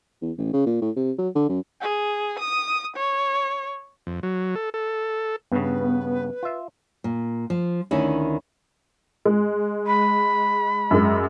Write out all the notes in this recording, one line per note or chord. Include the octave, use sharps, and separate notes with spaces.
E2
A1
C#3
A#2
A2
C3
F#3
D3
F#2
G#4
D#6
C#5
F2
F#3
A4
A4
G2 C#3 B3 B4
F4 E5
A#2
F3
D2 D#3 C#4 E4
G#3
B5
F#2 G#3